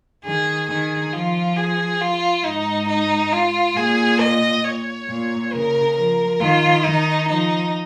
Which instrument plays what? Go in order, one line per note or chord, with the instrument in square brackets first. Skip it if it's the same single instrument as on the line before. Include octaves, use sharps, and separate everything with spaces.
[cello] D#3 [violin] G#4
[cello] D#3 [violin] G#4
[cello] F3 [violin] F4
[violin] G#4
F4
[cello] G#2 [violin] D#4
[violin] D#4
F4
[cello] A#2 [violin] G#4
[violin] D#5
C#5
[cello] A#2
[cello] C#3 [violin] A#4
[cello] F3 [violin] A#4
[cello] D#3 [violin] F4
[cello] D#3 [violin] D#4
[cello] F3 [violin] D#4